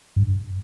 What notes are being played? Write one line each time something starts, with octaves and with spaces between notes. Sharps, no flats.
G2